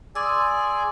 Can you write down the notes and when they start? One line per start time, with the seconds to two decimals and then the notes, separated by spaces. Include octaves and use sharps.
0.15 G#4 D5 G#5 C6 D6 E6